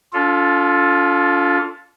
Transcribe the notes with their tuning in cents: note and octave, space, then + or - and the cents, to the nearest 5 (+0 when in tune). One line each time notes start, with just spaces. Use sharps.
D4 -45 F4 +10 A4 +0